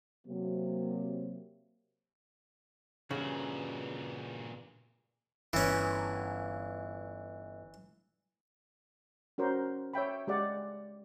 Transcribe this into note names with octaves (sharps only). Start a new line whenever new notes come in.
C3 F#3 A#3
G2 A#2 C#3 E3 F#4 F5
G1 E3 C#4
C#4 F#4 A#4 C5
C#5 E5 G5 B5
G#3 G4 D5 F#5